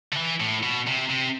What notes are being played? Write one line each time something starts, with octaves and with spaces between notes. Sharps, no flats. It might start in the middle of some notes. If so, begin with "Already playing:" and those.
D3
E3
A2
B2
C3
C3